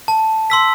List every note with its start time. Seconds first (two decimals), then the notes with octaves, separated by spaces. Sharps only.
0.08 A5
0.50 C6 E6 B6